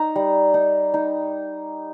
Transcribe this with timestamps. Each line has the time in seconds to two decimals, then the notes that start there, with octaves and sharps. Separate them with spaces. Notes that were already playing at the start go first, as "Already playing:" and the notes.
Already playing: D#4 A#5
0.16 G3
0.54 D#4
0.94 D#4